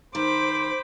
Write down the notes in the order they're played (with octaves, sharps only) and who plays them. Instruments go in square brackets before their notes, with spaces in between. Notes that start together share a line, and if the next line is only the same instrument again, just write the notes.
[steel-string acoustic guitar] D#3 [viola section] C5 [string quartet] B5 D6